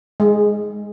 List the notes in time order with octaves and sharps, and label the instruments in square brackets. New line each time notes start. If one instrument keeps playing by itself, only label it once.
[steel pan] G#3